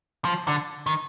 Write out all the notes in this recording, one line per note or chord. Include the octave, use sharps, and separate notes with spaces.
F3
D3
D#3